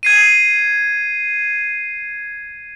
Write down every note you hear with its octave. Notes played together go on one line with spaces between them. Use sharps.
G#6 C7 D#7